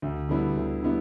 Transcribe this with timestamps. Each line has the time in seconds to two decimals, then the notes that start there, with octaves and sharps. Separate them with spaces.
0.02 D2
0.29 D3 G3 B3 E4
0.56 D2
0.83 D3 G3 B3 E4